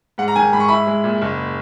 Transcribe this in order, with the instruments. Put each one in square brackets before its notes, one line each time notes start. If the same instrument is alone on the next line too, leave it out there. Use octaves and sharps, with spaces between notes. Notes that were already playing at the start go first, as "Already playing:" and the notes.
[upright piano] G#2 F#5
A#5
D#3 G#5
G#2 B5
C#6
E4 B5
G#3
A#2
F#1